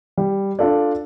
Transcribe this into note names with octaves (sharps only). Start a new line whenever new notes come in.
G3
D4 F4 A4 D5